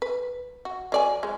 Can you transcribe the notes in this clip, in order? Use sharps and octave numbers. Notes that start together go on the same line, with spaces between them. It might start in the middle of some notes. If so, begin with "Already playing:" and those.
B4
F#4
F#3 D5 G#5
F3 G#3